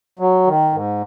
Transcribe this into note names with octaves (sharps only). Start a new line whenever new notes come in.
F#3
D#3
G#2